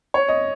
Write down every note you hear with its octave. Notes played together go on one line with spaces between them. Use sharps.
C#5
D#5